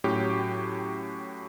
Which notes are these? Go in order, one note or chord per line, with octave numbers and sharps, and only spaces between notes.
A2 F#3 C#4 G4